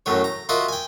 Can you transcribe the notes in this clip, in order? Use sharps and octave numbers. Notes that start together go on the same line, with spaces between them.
F#2 A2 F#3 C#5
A#5
F4 F#4 A#4 D#5 E5
G5 G#5